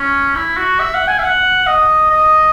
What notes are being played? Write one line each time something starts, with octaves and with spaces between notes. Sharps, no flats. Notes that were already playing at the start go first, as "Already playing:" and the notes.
Already playing: C#4
E4
F#4
E5
F#5
G#5
E5
F#5
D#5
D#5